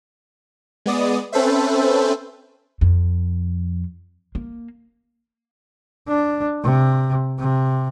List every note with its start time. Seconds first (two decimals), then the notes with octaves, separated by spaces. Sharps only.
0.86 G#3 B3 D5 D#6
1.32 C4 C#4 A4 B4 C5 E5
2.81 F2
4.35 A#3
6.08 D4
6.63 C3
7.39 C3